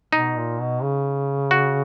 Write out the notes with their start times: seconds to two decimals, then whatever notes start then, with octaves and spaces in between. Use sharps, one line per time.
0.13 B2 D#4
0.36 A#2
0.60 B2
0.82 C#3
1.51 F#4